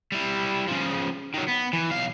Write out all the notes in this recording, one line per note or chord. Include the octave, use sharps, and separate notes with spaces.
G3 E4
C#3 F3
D#3 F#3
B3
E3
B1 F5